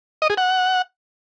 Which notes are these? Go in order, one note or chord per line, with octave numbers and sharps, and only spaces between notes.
D#5
G#4
F#5